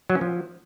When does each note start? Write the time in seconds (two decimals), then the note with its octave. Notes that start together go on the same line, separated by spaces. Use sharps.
0.10 F#3
0.15 C#4
0.21 F3